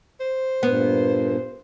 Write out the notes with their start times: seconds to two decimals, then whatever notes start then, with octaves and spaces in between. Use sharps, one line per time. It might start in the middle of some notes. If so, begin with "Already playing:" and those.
0.20 C5
0.63 G2 A#2 B3